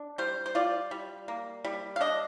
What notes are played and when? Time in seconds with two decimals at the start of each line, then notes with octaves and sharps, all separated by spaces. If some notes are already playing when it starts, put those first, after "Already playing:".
Already playing: D4
0.18 G3 C5
0.46 C5
0.55 F4 D5
0.91 G3
1.28 A#3
1.65 G3
1.96 F5
2.01 D4 D#5